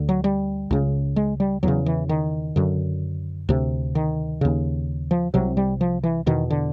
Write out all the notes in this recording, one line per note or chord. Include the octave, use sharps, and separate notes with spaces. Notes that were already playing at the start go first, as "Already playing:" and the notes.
Already playing: D2 D3
F#3
G3
C#2 C#3
G#3
G3
E2 C#3 F#3
E3
D#3
F#2 D3
D2 C3
D#3
D#2 C#3
F3
C2 C3 F#3
G3
F3
E3
E2 B2 D#3
D3